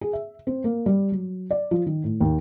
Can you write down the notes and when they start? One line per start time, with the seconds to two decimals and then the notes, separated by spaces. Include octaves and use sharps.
0.01 G#4
0.13 E5
0.47 C4
0.64 A#3
0.86 G3
1.12 F#3
1.51 D5
1.71 F3
1.86 D#3
2.04 A2
2.20 D#2